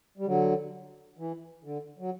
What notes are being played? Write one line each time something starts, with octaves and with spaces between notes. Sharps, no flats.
G3
D3 F#3
E3
D3
F#3